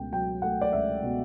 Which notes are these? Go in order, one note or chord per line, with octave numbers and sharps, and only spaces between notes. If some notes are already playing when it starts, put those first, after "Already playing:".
Already playing: C#2 B2 A3 G5
F#3 G5
A3 F#5
D5
C#2 E5
B2